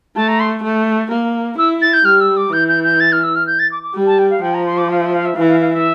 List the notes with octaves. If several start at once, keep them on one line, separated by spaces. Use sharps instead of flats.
A3 A5
A#5
C6
A3
A#3
E4 E6
A6
G6
G3 F6
E6
D6
E3 G6
G6
G6
A6
F6
E6
F6
G6
A6
D6
D6
G3
A5
G5
F5
F3 G5
A#5
C6
D6
F5
E5
F5
E5
E3 F5
F5
F5
E5